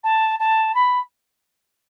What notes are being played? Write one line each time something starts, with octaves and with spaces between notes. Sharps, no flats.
A5
A5
B5